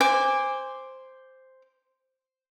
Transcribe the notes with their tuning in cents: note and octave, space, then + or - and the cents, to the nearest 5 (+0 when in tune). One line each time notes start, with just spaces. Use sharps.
C5 +0 G#5 -25 D6 +0